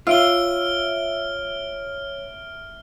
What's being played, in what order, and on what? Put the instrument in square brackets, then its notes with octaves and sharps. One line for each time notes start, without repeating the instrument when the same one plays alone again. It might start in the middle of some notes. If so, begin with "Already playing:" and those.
[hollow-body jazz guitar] F4 [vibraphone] C#5 [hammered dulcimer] E5 [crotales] F6 D7 G7